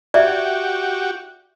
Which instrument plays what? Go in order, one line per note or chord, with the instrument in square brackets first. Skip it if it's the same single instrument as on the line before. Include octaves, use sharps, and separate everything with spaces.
[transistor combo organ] F#4 G4 [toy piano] D5 E5